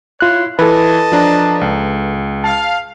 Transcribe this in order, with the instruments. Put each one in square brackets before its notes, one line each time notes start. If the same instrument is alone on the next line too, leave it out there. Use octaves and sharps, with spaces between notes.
[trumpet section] E4 C#5 C6 [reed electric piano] F4 F#6
[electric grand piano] E3 [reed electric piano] A4 B4 [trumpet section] D#5 A5
[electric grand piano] F3 D4 A#5
C#2
[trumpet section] F5 [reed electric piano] A5